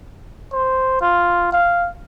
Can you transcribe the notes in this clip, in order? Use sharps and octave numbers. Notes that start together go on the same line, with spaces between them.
C5
F4
F5